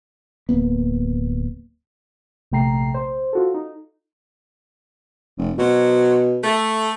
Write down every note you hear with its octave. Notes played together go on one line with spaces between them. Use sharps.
D1 A#3 B3
A#1 C3 A3 G5 A#5 C7
C5
F4 F#4 A4
D#4
F1
B2 F#3 C5 C#5
A3